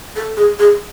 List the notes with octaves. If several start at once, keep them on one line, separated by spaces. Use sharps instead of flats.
A4
G#4
G#4